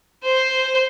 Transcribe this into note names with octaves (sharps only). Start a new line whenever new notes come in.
C5